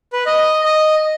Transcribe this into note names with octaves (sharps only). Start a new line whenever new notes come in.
B4
D#5
D#5